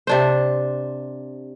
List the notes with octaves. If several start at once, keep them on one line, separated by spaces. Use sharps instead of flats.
C3 D4 C5